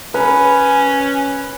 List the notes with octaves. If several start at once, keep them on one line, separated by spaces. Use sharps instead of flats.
C#4 B4